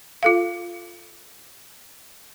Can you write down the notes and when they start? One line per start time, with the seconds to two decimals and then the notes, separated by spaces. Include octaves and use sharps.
0.23 F4 A4 F5